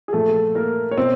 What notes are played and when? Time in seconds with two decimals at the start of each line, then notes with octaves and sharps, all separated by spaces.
0.08 G#4
0.13 A#2 F3 A3 A4
0.55 A#3 A#4
0.91 C#5
0.97 B2 C4 C5